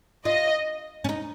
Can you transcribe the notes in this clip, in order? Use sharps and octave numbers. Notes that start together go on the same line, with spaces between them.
F4 D#5
C#4
D#4